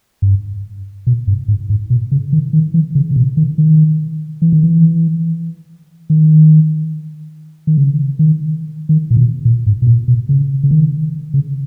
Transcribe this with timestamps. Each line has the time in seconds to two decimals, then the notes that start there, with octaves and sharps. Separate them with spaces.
0.22 G2
1.07 B2
1.27 G2
1.48 G#2
1.70 G#2
1.90 B2
2.12 C#3
2.32 D#3
2.53 D#3
2.74 E3
2.95 C#3
3.11 C#3
3.16 B2
3.37 D#3
3.58 D#3
4.42 E3
4.52 D#3
4.63 E3
6.10 D#3
7.67 D#3
7.78 C#3
8.19 D#3
8.89 D#3
9.11 A#2
9.17 B2
9.45 A#2
9.66 G#2
9.82 B2
9.87 A#2
10.08 B2
10.29 C#3
10.63 C#3
10.71 D#3
11.34 C#3